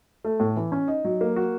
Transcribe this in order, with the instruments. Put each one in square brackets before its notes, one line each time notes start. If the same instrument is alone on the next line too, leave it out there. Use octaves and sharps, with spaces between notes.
[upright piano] A3
A2
E3
C#4
D#4
F#3
A#3
F#4